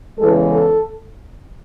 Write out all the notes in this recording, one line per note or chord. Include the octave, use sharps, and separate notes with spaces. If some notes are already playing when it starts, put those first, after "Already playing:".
E2 C#3 E3 G#3 A4
A4